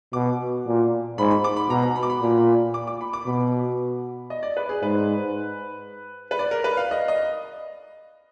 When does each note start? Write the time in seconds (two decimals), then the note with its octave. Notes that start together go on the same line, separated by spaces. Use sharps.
0.13 B2 D6
0.66 A#2
1.18 G#2 B5
1.31 B5
1.44 D6
1.56 B5
1.69 B2 A#5
1.82 A#5
1.96 B5
2.03 D6
2.10 B5
2.21 A#2
2.74 D6
2.87 D6
3.01 B5
3.13 D6
3.26 B2 B5
4.30 D#5
4.43 D5
4.57 B4
4.69 G#4
4.83 G#2 B4
6.31 B4
6.39 D5
6.51 A#4
6.64 B4
6.77 F5
6.91 D#5
7.08 D#5